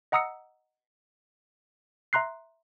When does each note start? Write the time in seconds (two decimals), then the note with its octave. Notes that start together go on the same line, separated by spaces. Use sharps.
0.12 D#5 F#5 A#5 D#6 E6 C#7
2.13 E5 A#5 C6 F#6 C7